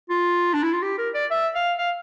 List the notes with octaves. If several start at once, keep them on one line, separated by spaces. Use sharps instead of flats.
F4
D4
E4
F4
G4
A#4
D5
E5
F5
F5